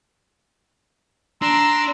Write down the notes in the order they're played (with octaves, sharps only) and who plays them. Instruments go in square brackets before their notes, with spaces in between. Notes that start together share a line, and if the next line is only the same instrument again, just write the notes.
[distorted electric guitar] D4 [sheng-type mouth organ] A#5 C6 E6